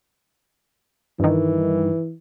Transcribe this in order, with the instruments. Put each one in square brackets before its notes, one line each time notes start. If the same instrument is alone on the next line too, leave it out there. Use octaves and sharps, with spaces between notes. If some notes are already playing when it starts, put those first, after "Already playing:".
[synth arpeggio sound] G2 D#3 [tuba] E3